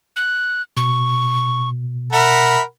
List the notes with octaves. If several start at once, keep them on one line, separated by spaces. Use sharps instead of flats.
F#6
B2 C#6
A#4 E5 F#5 B5